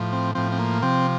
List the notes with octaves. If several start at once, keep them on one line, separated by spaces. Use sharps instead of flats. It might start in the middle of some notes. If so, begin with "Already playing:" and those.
Already playing: A2 F3
C4
A2 F3 C4
C4
A#3
C3 F3 C4